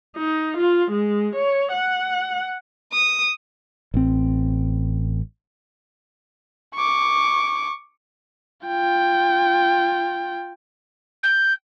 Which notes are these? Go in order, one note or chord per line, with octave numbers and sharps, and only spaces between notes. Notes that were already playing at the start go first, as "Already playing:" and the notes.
D#4
F4
G#3
C#5
F#5
D#6
A1 C4
C#6 D6
F4 G5
G6